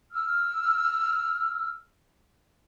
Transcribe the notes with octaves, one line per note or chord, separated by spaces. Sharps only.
E6 F6